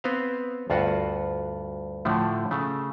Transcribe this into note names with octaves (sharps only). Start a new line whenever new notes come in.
B3 C4 B4 C5 F5
D2 G2 F4 F#4 F#5
A2 D3 F3 A3
C#3 A3